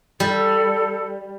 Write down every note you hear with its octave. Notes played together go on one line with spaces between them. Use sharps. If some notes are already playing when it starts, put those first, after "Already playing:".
G3 A4